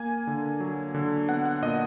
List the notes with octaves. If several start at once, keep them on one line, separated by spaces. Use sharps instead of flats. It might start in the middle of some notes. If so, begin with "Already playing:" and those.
Already playing: A#3 G#5
D3
F#3
D3
B3 F#5
F#5
A#2 D#5